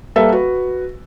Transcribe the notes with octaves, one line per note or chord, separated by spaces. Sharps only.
G3 A#3 A4 B4 E5 F5
F#4 B4